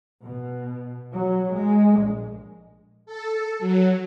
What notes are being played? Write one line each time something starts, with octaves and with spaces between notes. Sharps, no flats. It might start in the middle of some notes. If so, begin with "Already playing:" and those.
B2
F#3
G#3
A#1
A4
F#3